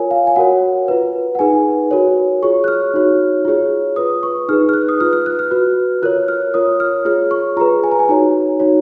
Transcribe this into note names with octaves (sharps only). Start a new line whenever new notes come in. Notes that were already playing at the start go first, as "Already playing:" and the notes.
Already playing: F4 A#4 C#5 G#5
F5
G#5
F#4 A#4 C#5 F#5
F4 B4
F#5
D#4 G#4 B4 G#5
F#4 A#4 C#5
F4 G#4 C#5 C#6
F#6
F6
D#4 F#4 C#5
F4 G#4 C#5
F4 B4 D#6
C#6
D#4 G#4 B4 F6
F6
F#6
D#6
F4 B4 F6
F6
F#6
F6
F#4 B4
F4 A#4 C#5 F#6
F6
F4 A#4 C#5 D#6
F6
F4 G#4 C#5 F6
C#6
F4 G#4 B4 A#5
G#5
A#5
G#5
D#4 F#4 C#5 A#5
D#4 F#4 C#5